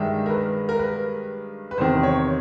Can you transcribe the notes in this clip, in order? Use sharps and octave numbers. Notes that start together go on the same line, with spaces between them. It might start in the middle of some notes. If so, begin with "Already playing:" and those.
Already playing: G2 D#3 G#3 E5
A#4
B4
A#4
B4
B4
E2 C3 D#3 C5
C#5